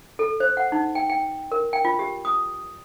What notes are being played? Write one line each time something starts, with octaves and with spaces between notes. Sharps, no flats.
A4
C5
F#5
D#4
G5
G5
A#4
G5
F4
G4
D#6